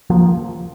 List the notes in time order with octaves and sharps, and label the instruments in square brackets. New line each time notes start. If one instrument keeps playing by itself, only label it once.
[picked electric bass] F3 A#3